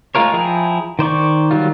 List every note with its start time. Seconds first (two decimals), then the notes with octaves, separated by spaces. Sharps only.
0.15 G#3 A3 F4 A#4 C#5
0.33 F3 E4 G#4 G5 A#5
0.99 D#3 C5 D5 C#6
1.51 D#3 F#3 G3 F4